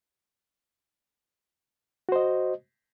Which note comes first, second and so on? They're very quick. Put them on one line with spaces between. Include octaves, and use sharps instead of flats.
F#4 C5 D#5